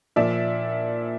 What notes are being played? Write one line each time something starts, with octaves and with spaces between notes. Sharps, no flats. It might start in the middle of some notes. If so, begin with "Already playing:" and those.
A#2 F3 D5 E5